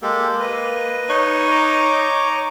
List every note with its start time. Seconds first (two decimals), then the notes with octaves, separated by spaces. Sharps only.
0.02 G#3 A#3 G4 A4
0.40 B4 D#5
1.09 D#4 C#5
1.51 D#5 A#5 D6